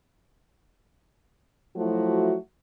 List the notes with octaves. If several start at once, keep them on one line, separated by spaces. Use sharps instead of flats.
F3 F#3 A3 E4 F#4